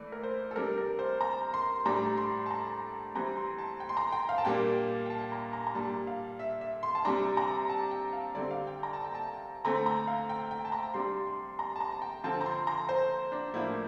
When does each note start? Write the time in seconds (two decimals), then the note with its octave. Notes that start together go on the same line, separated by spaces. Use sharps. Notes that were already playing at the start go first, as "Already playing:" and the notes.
Already playing: E3 A3 D5
0.12 A#4
0.23 C5
0.51 A4
0.56 C3 G3 D4 A#4
0.78 A#4
0.99 C5
1.21 A#5
1.54 C6
1.85 A2 G3 D4 A#5
2.17 C6
2.46 A5
2.51 A#5
3.15 E3 G3 C4 A#5
3.37 C6
3.58 A5
3.80 G5
3.89 C6
3.97 A#5
4.12 G5
4.29 F5
4.38 A5
4.45 A#2 G3 A#3 D4 G5
5.06 G5
5.10 A5
5.32 A#5
5.53 A#5
5.67 A#5
5.75 A#2 G3 D4 A5
6.07 F5
6.39 E5
6.61 E5
6.83 C6
6.95 A5
7.05 C3 G3 D4 A#5
7.37 A#5
7.69 A5
7.91 G5
8.13 F5
8.35 D3 G3 C4 D5
8.51 F5
8.67 G5
8.83 A#5
8.93 A5
9.04 G5
9.15 A5
9.65 D3 A3 C4 A#5
9.86 A#5
10.08 F5
10.29 G5
10.51 G5
10.65 A5
10.72 A#5
10.94 C3 G3 D4 C6
11.27 C6
11.59 A#5
11.76 A5
11.81 A#5
11.92 A5
12.02 G5
12.24 D3 F3 C4 A5
12.41 A#5
12.46 C6
12.67 A#5
12.89 C5
13.32 D4
13.54 A2 F3 A#3 D4 E4